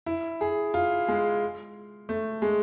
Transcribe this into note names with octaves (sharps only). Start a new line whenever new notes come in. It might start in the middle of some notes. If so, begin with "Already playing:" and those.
E4
G#4
F4
G#3
A3
G#3